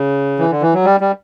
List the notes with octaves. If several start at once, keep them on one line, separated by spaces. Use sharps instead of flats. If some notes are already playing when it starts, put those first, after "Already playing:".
Already playing: C#3
E3
D3
E3
F#3
G3
G3